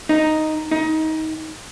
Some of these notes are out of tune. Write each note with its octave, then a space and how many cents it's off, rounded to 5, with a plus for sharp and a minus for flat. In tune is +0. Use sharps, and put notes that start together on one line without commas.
D#4 +0
D#4 +25